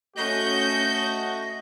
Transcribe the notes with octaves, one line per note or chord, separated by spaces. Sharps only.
A3 C#4 F#4 D#5 G6